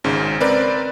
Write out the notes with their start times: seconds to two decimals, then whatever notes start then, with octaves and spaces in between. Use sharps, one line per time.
0.04 G#1 G#2 C#3
0.40 C4 A#4 B4 D5